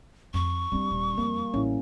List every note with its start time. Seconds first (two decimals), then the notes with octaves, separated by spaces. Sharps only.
0.34 F2 C#6
0.72 G3 C4 D4
0.91 D#1
1.18 F2 A#3
1.54 A1 C#4 E4